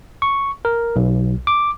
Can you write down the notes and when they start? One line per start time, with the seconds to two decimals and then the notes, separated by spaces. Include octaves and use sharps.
0.22 C#6
0.65 A#4
0.96 B1
1.47 D6